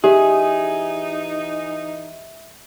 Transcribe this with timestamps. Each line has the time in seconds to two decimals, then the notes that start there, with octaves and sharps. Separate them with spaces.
0.04 E3 D#4 G4 G#4 E5